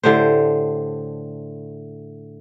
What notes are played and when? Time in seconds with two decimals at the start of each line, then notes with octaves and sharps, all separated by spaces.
0.04 A2 D3 G4 C5